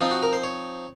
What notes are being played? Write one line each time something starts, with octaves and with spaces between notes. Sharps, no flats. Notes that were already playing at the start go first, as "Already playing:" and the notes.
F3 C4 D#4 F4
F#4
A#4
C5
C#5